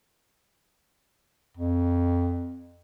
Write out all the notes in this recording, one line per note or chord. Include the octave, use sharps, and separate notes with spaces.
F2